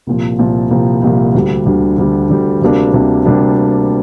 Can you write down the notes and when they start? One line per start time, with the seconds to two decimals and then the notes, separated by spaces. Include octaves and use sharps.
0.07 C2 A#2 F3
0.39 C2 A#2 F3
0.71 C2 A#2 F3
1.02 C2 A#2 F3
1.34 D2 D3 G3
1.66 D2 D3 G3
1.98 D2 D3 G3
2.30 D2 D3 G3
2.62 D2 C3 G3 A#3 D4
2.93 D2 C3 G3 A#3 D4
3.26 D2 C3 G3 A#3 D4